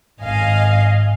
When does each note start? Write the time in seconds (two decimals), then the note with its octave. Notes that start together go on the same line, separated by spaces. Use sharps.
0.20 G#1 D#5 F5 G#5